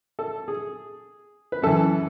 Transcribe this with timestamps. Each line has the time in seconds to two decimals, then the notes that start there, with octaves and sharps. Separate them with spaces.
0.19 A4
0.48 G#4
1.52 B4
1.62 F#2 E3 A4